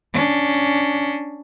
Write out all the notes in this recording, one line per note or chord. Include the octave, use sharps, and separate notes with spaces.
C#4 D4